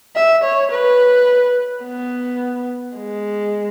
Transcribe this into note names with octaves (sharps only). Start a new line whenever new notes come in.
E5
C#5
B4
B3
G#3